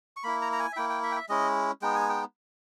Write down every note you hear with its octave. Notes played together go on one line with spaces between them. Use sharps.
C#6
A#3 E4 B5
A#5
A#5
G#5
E5
A#3 E4 G5
G5
E5
G5
E5
G#3 C#4 E4 D#5
G#3 B3 D#4 G5
G#5
G5